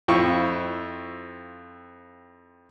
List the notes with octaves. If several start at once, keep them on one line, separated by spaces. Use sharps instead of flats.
F2 C4 E4 F4 C#6